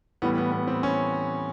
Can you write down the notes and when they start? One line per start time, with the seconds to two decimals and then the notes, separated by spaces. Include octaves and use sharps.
0.22 A2 E3 G3 B3
0.38 B3
0.52 B3
0.67 C4
0.83 C#4